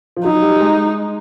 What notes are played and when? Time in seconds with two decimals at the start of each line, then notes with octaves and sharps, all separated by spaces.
0.16 F3
0.25 F#3 D#4
0.42 G3
0.60 G#3